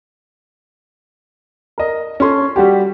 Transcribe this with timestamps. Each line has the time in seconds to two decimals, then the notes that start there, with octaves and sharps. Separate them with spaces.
1.78 A#4 D#5
2.20 C#4 A4 C6
2.56 G3 F#4 G4